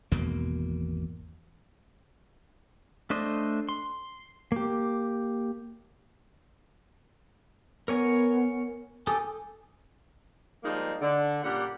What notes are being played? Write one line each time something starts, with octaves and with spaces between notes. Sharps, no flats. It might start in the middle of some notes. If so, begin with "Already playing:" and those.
G#1 E2 B2 A#3
A3 D4 C5 D#5
C6
A#3 G4
B3 A#4 C#5 G#5
G4 A4 G#5 D#6
F3 G3 G#3 A#3 D#4 F4
D3
A#2 C#3 G3 F#5